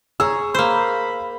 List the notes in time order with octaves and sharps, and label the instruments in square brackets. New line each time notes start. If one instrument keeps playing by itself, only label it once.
[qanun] G#4 C#5 [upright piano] A#5 E6
[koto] A#3 C5 [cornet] B5